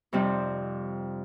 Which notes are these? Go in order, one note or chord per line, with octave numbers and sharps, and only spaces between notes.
F2 C3 G3 C4 D#4